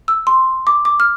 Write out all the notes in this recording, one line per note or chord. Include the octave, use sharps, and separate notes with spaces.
E6
C6
D6
D6
F6